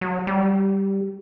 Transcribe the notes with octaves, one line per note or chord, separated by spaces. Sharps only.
F#3
G3